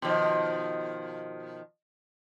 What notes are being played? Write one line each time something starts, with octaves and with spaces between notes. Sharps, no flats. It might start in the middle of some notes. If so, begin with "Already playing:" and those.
B2 D#3 F3